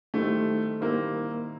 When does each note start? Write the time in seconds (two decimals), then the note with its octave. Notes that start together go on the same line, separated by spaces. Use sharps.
0.14 D#3 G3 A3 C4 E4
0.81 D#3 G3 A#3 C4 E4